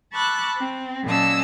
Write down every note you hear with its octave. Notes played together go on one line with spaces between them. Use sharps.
A5 B5 C#6 D6 E6 F#6
C4
A#2 F#3 C#4 D#5 A5 E6